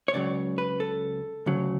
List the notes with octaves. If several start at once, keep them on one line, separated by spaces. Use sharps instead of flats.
C#5
C#2 C#3 F#3 D5
B4
A4
D2 C#3 F#3